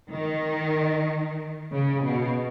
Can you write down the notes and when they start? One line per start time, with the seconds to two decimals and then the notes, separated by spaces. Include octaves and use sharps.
0.10 D#3
1.73 C#3
2.05 B2